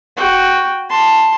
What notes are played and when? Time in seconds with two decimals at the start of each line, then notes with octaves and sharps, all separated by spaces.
0.17 F#4 G5
0.90 A5 C6